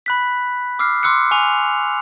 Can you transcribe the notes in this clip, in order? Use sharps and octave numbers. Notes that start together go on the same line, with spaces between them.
B5 F#6 B6
D6 E6 F6 C7
C6 D6 E6 F#6 C#7
G#5 C#6 F7